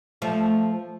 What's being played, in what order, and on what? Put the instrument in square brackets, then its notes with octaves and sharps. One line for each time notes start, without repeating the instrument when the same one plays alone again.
[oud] F3 A3